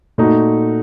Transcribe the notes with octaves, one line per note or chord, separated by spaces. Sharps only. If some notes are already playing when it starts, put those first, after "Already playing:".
A#2 A3 D#4 F#4